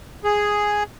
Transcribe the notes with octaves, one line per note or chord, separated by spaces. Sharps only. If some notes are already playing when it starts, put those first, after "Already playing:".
G#4